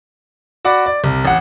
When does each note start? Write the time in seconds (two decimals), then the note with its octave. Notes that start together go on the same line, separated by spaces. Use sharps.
0.65 F#4 D5 F#5 B5 D6
0.86 D5
1.04 C2
1.25 A1 F#5